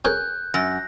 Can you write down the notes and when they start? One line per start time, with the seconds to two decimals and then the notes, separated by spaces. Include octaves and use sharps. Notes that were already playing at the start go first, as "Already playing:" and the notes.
0.05 C#4 G#4 A#4 F#6 G6
0.54 F#2 A#6